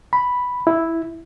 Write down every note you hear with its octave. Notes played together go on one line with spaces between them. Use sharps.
B5
E4